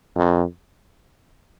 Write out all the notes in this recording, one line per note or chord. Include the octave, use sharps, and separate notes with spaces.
F2